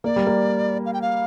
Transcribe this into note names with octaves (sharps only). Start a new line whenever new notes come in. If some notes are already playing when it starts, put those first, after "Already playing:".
A#3 D5
G3
A#3
F5
G5
F5